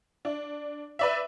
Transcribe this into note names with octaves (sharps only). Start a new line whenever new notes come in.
D4
B4 D5 E5